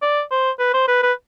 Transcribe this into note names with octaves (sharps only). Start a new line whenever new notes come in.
D5
C5
B4
C5
B4
B4